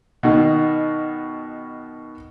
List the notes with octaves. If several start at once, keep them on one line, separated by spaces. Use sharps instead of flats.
B2 D#3